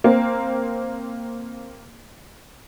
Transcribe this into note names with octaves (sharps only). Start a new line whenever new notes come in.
A#3 C4